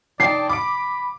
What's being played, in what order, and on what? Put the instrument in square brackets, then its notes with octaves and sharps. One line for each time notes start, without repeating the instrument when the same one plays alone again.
[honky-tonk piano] D#4 G5 A5 [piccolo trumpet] D5 [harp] C7
[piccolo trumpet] B5 [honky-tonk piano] D6 D7